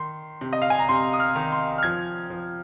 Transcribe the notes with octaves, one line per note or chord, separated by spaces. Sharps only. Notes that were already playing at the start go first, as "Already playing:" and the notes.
Already playing: D#3 C6
C3
D#5
F5
G#5
A#5
C3 C6
D#6
F6
D#3
C6
F6
F3 G#6
F3